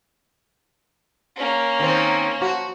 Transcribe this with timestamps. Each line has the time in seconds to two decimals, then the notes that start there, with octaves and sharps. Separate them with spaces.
1.36 A#3 C#4
1.80 D#3 C4
2.41 F3 F#4